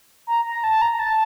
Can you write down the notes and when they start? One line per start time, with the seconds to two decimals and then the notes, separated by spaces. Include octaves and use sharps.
0.27 A#5
0.45 A#5
0.64 A5
0.82 A#5
0.99 A5